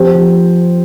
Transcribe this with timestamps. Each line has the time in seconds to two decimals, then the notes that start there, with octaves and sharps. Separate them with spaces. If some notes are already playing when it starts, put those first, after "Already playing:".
Already playing: F2 F3 G4 C5
0.14 F3